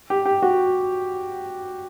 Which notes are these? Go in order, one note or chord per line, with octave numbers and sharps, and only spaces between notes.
G4
G4
F#4